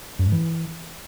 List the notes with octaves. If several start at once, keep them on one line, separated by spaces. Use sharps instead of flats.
F#2
G#2
E3